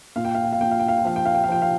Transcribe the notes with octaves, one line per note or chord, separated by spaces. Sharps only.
A#2 F5
G5
F5
G5
F5
A#2 G5
F5
G5
F5
G5
F3 F5
G5
F5
G5
F5
F3 G5
F5